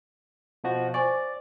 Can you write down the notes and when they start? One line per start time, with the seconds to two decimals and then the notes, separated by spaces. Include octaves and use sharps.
0.64 B2 F3 F#4
0.94 C5 D5 G#5 C#6